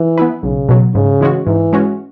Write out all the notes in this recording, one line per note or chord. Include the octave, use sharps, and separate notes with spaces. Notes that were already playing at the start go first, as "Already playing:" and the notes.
Already playing: E3
B3 E4 B4
B1 C#3
B2 F#3
G#2 C#3
E3 G#3 C#4 F#4
G#2 E3
G#3 C#4 F#4